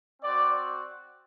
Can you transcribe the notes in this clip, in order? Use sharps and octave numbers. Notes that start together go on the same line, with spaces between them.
C4 F#4 D5